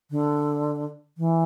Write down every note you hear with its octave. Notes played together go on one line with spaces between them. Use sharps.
D3
E3